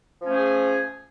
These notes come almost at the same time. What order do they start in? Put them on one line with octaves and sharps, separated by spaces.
F3 C#4 A3 G#4